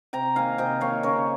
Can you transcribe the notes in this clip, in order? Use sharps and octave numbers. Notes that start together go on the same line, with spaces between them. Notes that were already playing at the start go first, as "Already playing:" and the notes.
C3 G5 A#5
D#3 A#3 F5 G#5
C3 D#5 G5
D#3 A#3 C#5 F5
C#3 A#4 C#5